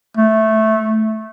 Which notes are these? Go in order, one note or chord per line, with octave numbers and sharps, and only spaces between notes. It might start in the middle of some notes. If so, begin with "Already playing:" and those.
A3